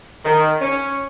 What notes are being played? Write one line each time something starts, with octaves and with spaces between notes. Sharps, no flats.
D#3
C#4